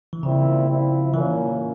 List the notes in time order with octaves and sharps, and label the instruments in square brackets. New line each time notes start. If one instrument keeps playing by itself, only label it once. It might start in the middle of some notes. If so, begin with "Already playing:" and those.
[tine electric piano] E3
[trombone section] A#2 G3 C4 E4 [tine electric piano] C#3
[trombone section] F3 C4 E4
[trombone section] A#2 G3 A#3 C#4 [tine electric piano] E3